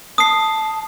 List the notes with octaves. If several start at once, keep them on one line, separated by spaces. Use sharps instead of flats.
A5 D#6 C7